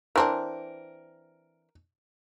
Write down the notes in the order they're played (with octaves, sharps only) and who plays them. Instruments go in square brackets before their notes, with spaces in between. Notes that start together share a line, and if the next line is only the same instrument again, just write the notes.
[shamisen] E3 C4 D4 [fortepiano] A#4